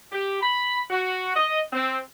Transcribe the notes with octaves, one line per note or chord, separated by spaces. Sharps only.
G4
B5
F#4
D#5
C4